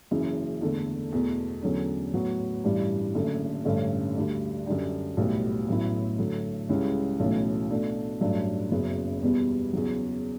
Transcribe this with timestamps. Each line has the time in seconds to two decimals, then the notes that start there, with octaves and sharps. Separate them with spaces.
0.11 F#1 F#2 C#3 E3
0.61 E2 D3 A3
1.12 E2 B2 A3
1.63 E2 D3 F#3 A3 C#4
2.13 A2 F#3 B3 F#4
2.64 A1 G2 E3 G3 D4
3.15 F#1 F#2 D3 A3
3.65 A1 G2 D3 A3 C#4
4.16 D2 D3 G3
4.66 F#2 D3 G3 D4 G4
5.17 B1 A2 G3 B3
5.68 A1 A2 F#3 B3 E4
6.18 D3 F#3 A3
6.69 C#2 C#3 G3 C#4 E4
7.20 B1 A2 E3 A3 C#4
7.70 B2 A3 D4
8.21 A1 G2 F#3 A3 D4
8.71 F#1 F#2 C#3 F#3 B3
9.23 E2 B2 G3 B3
9.73 E2 C#3 F#3